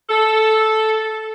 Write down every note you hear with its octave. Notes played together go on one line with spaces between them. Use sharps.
A4